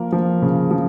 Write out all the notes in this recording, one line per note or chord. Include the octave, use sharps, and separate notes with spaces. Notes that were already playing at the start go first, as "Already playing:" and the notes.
Already playing: F3 A#3 A#4
F3
C#3
F3